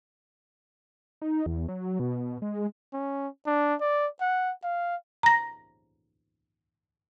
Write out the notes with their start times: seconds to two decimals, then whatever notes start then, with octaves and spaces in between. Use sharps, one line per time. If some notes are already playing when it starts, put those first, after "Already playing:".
1.22 D#4
1.46 E2
1.68 F#3
2.00 B2
2.42 G#3
2.93 C#4
3.47 D4
3.81 D5
4.21 F#5
4.64 F5
5.23 A#5 A#6